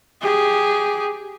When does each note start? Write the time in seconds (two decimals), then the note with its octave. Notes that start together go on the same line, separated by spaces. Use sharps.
0.22 G4 G#4